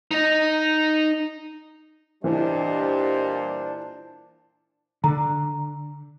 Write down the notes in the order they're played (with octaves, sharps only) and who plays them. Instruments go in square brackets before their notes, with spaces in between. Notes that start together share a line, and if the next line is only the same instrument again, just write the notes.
[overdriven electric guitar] D#4 D#5
[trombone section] A#2 C5 [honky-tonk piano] E3 [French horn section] G3 G4 D#5 [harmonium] D4
[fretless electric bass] D3 [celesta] A#5